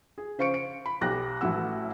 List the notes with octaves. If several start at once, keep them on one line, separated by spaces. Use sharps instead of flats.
G#4
C#3 C5 F5 C#6 C#7 D7
D7
B5
B1 G4 F#6 A#6
A1 F#3 A3 E4 F#5 E6